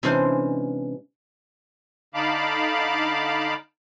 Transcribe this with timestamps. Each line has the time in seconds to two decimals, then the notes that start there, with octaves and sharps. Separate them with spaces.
0.03 C3 E3 G#3 C#4 D4 C5
2.14 D3 D#4 F5 A5 B5 D6